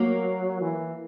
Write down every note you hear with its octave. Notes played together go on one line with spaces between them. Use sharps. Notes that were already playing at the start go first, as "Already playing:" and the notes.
Already playing: F#3 A#3
E3